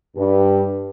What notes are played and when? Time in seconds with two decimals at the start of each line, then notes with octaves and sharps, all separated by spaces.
0.16 G2